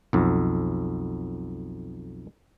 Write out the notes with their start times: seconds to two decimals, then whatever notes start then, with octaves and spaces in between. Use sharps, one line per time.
0.13 B1 F2